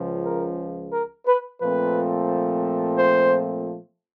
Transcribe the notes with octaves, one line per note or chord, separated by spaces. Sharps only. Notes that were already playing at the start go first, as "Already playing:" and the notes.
Already playing: C#2 C#3 F3
A#4
A#4
B4
A#2 F3 A3 C4 B4
C5